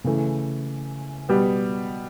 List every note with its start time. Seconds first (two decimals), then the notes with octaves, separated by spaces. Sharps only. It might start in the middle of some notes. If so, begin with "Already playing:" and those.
0.04 C#3 E3 A3
1.29 B2 G3 B3